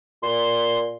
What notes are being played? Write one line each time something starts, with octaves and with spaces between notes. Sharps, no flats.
A#2 C6